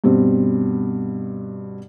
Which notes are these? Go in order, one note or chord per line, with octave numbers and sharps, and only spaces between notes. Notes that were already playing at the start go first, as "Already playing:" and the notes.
G2 B2 C4